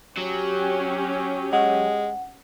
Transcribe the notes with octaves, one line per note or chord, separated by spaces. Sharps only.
F#3 C#4 G4
G#3 F#5